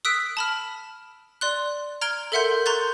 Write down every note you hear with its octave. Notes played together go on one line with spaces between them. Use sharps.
D#6 E6 F#6 B6 D7
A5 B5 F6
D5 C6 F#6
A#5 F6 G#6 D7 G7
A4 A#4 E5 F#5 C6 G6
A#5 C6 C#6 F#6 G6 A6